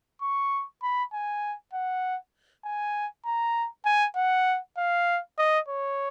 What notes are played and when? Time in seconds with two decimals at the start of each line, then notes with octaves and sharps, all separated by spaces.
0.22 C#6
0.83 B5
1.13 G#5
1.73 F#5
2.65 G#5
3.25 A#5
3.85 G#5
4.16 F#5
4.77 F5
5.38 D#5
5.68 C#5